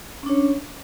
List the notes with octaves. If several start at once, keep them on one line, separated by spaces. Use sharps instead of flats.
C#4 D4 C#5